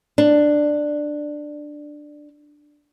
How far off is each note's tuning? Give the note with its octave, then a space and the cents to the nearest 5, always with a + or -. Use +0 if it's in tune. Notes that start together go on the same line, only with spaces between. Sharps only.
D4 +10